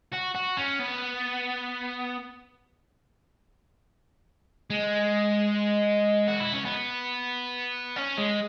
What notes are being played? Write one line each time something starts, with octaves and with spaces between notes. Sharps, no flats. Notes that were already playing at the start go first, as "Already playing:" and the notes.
F#4
F#4
C#4
B3
G#3
F#4
E4
C#4
B3
C#4
G#3